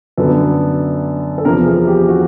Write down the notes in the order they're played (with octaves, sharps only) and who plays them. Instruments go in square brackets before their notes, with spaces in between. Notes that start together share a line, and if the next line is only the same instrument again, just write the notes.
[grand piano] F#2 D3 F#3 B3 A4
A4
E2 C3 F3 A#4
G#4
G4
F#4